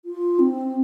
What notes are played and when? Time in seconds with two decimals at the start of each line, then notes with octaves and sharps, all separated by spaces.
0.05 F4
0.39 C4